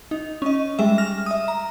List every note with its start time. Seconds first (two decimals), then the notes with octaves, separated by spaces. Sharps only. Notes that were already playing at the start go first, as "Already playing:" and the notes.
0.11 D#4
0.42 C#4 D#5
0.79 G3 G#3 E5
0.98 F6 A#6
1.26 E5 D#6
1.48 A#5